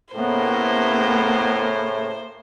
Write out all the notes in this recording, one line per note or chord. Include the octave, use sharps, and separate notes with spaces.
A2 C#3 A#3 B3 C5